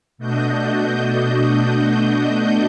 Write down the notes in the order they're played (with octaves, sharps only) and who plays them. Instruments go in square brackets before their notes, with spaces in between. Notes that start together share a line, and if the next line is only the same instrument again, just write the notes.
[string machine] B2 A3 D4 F#4 D#5 G6